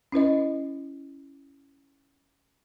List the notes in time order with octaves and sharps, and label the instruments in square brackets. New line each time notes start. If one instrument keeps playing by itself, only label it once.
[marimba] C#4 E4 B4 D#5